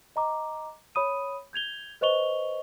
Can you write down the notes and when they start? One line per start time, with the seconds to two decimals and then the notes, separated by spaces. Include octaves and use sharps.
0.16 D#5 A#5 D6
0.95 C#5 B5 D#6 D#7
1.53 G6 G#6 F7 G7
2.01 B4 C5 D#5 C#6 F7 G7